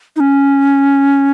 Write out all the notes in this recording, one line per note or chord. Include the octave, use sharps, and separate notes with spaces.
D#4
C#4